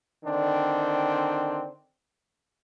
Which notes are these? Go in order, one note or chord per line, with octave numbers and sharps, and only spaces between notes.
D3 D#3 C4 D4